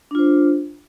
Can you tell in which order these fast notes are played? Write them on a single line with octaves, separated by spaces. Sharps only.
D4 F4 C5